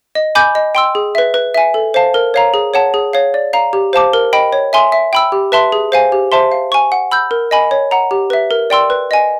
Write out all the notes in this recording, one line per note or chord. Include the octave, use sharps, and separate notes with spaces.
D#5
G#5 B5 D6 G6
D#5
G5 C6 E6
G#4
B4 E5
B4
E5 G#5
A4
C5 F5 A5
A#4
C#5 F5 A#5
G#4
C#5 F#5 A5
G#4
C#5 F5
D5
F5 A#5
G4
C5 F5 A5 D6
A#4
D#5 G5 B5
C#5
E5 G#5 C6
E5
G5 B5 E6
G4
B4 E5 A5 C6
G#4
C5 F5 G#5
G4
C5 E5 A5 C6
F5
G#5 C#6
F#5
B5 E6 G6
A#4
D#5 G#5 B5
C#5
F#5 A#5
G4
B4 E5
A#4
D5 G5 C6 E6
B4
D#5 G#5